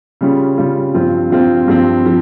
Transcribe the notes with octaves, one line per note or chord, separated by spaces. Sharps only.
C#3 G3 C#4 F4
C#3 G3 C#4 F4
G2 F3 C4 F4
G2 F3 C4 F4
G2 F3 C4
F3